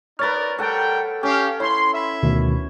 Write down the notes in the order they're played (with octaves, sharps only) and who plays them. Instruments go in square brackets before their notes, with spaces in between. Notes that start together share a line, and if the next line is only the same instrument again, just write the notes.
[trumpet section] D#4 A#4 D5 [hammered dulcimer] B4 C#5 [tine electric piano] F6 A6
[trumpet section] G3 A#4 G5 [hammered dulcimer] A4 F#5
[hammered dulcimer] C#4 [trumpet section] G4 F5
[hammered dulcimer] E4 [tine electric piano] C#5 [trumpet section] C6
[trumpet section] E5 B5
[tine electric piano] D2 B2 D#3